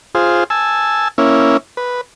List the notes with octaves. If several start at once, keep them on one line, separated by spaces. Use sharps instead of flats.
F4 G#4 C5
G#5 A5 E6
A#3 C#4 E4
B4